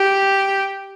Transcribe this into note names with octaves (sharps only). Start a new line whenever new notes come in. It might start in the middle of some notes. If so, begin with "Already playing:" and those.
Already playing: G4